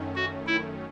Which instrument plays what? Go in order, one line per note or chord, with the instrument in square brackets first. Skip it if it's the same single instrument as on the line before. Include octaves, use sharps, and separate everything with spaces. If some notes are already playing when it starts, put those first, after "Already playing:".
Already playing: [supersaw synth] F#2 D#3 A3 C#4
[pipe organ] F#4
E4